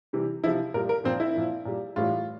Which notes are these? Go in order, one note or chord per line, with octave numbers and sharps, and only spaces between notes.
C3 E3 G3
C3 F3 E4
A#2 G3 A#4
A#4
A#2 F3 C4
E4
A#2 F3
A#2 G3
A2 E3 G3 F4